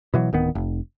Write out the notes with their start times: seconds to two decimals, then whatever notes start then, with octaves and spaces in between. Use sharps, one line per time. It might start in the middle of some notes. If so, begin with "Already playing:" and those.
0.14 B2 E3 F#3
0.33 D1 D#3 B3
0.55 F1